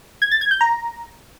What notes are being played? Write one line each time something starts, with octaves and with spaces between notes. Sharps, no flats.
G#6
A6
G#6
G6
A#5